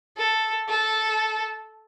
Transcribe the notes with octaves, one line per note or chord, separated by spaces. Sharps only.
A4
A4